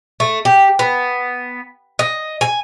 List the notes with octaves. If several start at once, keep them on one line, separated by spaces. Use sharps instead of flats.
A3
G4
B3
D#5
G#5